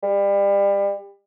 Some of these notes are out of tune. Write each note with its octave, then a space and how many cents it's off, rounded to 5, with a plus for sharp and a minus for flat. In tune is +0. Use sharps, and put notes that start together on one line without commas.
G3 +30